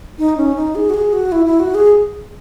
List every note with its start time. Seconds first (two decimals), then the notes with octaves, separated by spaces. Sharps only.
0.19 D#4
0.37 C#4
0.56 D#4
0.75 G#4
0.90 F#4
0.94 G#4
1.13 F#4
1.32 E4
1.46 E4
1.60 F#4
1.75 G#4